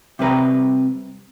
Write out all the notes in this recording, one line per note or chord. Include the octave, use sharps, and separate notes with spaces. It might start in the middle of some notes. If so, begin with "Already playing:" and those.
C3 G3 B4 A#5